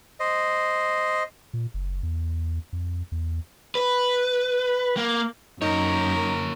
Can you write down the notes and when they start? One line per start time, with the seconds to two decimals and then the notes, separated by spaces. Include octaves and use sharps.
0.20 C5 D#5
1.54 A#2
1.74 F#1
2.03 E2
2.73 F2
3.12 E2
3.75 B4
4.97 A#3
5.62 F#2 A#3 D#4 A#4 C#5